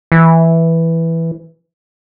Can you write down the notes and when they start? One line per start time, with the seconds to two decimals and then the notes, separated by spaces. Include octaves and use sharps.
0.12 E3